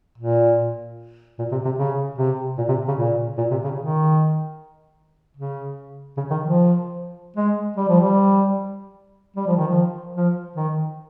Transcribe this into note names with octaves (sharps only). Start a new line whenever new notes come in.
A#2
A#2
C3
C3
C#3
C3
A#2
C3
C#3
A#2
A#2
C3
C#3
D#3
C#3
C#3
D#3
F3
G#3
G3
F3
G3
G3
F3
D#3
F3
F3
D#3